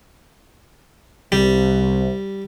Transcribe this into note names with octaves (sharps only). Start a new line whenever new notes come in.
C2 G3